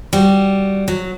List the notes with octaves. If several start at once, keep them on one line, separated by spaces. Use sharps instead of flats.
G3 F#4
F#3